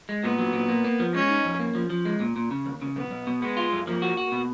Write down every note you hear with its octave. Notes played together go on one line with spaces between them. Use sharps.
G#3
A#2 B3
F#3
A#2
A#3
A#3
F3
G#3 C#4
D#4
F2
A#3
F3
F3
G#3
A#2
A#2
C#3
D#2
C#3
B1 B3
B1
B2
G#3 B3
F4
F#2
F3 A#3
F#4
F#4
B2